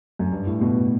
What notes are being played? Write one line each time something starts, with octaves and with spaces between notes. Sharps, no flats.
F#2
G2
A2
B2